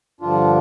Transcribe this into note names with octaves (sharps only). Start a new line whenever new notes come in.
G2 D3 F3 D4 F4